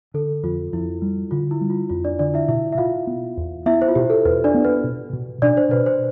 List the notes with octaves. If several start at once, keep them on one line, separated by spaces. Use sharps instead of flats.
D3 A4
F2 F4
F2 E4
G3
D3 F4
E4
G3
F4
F2 F4
D4 D5
D3 D4 D5
E4 E5
B2 E4 E5
E5
B2 F4 F5
B3
E2
B3 E4 E5
C5
F4
B2 G4
A4
E2 B4
D4 D5
B3
B4
B2
B2
B2 D4 D5
C5
B2 B4
C5